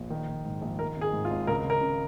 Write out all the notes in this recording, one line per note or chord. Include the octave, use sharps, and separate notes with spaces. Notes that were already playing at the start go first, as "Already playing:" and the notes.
Already playing: A#1
D#3
A#1
G#2
A#1
D#3 A#4
G#1
G#4
G#2
F4
G#1
C#2 A#4
C#2
A#4
C#3